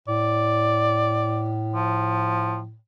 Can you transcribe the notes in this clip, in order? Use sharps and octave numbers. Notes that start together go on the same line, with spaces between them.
A2 D5
F3